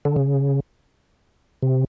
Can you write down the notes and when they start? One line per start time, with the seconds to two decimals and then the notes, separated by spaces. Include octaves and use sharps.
0.05 D3
0.16 C#3
1.62 C3